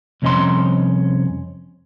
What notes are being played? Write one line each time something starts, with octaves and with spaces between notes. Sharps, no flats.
C2 F2 C#4 D#5 A#5 C6